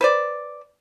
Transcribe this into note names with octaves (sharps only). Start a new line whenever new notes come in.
B4 C5 D5